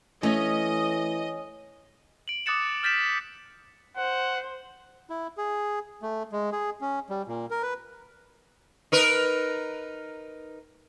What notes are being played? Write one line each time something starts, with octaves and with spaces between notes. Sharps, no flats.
E3 A3 C#4 D#5
D7 F#7
D6 D#6 F#6 A6 C#7 E7
F6 G6 A6 B6 D7 E7
C5 F#5
E4
G#4
A3
G#3
G#4
C#4
G3
A#2
A#4
B4
D#4 A#4 B4